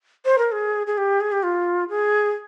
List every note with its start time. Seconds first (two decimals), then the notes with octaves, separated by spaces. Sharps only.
0.25 C5
0.38 A#4
0.52 G#4
0.87 G#4
0.97 G4
1.20 G#4
1.32 G4
1.43 F4
1.89 G#4